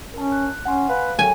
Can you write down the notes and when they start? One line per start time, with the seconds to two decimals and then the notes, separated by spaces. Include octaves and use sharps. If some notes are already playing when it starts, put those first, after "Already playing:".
0.14 C#4 A#4 A5
0.32 F#6
0.65 C#4 F#5 G#5 C6
0.89 B4 F5
1.19 F#3 A4 A#4 G5 G#5